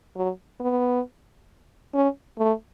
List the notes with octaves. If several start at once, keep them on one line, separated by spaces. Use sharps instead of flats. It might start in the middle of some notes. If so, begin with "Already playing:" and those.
F#3
B3
C#4
A3